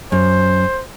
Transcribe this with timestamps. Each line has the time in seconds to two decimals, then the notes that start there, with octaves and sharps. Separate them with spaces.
0.12 F#2 C5